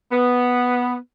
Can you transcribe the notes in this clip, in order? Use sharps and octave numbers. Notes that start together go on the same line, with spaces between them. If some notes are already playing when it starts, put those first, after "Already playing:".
B3